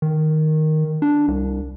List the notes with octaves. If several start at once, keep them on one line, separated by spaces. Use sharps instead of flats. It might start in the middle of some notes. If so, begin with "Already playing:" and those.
D#3
D4
C2